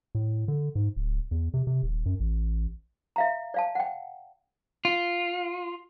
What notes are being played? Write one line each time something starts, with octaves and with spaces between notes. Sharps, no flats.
A2
D3
G#2
D1
E2
C3
C3
D#1
F#2
A1
E5 F5 A#5
D5 F5 A5
F#5 G5
F4